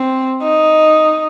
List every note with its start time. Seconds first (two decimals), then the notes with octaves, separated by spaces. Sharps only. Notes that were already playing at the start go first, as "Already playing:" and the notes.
Already playing: C4
0.43 D#4